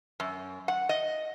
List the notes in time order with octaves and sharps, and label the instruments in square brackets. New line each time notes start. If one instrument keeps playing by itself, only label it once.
[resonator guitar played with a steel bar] F#2
F#5
D#5